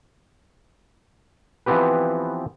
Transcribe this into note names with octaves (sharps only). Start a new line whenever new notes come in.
E3 F3 B3 C4 G4 B4